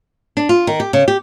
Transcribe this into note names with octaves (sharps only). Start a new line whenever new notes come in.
D4
F4
D#3
G4
C#3
G4